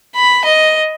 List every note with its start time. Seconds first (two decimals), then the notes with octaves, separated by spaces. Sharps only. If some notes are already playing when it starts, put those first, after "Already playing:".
0.16 B5
0.45 D#5